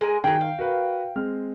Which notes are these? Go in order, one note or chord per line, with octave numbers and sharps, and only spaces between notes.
G#3 A#4 G#5
D#3 F#3 G#4 G5
F5
F#4 A#4 B4
G#3 C4 F6